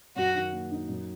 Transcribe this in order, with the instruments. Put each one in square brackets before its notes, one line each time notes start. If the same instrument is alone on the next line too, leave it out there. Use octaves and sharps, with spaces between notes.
[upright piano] F#2 [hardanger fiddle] F#4
[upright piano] D#3
A#3
D#4
F#2